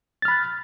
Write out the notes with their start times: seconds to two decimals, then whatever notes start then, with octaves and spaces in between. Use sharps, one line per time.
0.22 A6
0.25 F6
0.28 B5
0.31 F#6